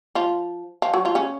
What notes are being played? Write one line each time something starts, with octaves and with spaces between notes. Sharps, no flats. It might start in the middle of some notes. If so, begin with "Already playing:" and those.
F3 F4
F3 F4
F#3 F#4
F3 F4
C#3 C#4